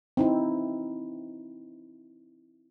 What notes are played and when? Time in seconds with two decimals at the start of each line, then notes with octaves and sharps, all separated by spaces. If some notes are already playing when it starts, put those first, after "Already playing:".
0.17 C4 D#4 E4